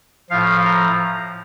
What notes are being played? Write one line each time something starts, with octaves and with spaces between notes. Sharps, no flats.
A2 F3 F5
A#5